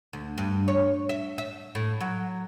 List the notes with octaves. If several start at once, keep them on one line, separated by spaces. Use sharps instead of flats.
D2
G2
C#5
E5
E5
A2
F#3